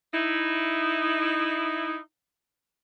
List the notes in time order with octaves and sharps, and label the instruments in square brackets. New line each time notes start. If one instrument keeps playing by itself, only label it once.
[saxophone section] D#4 E4